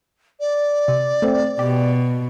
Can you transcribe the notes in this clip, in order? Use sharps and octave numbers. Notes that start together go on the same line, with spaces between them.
D5
C3
A3 C4
B2 G4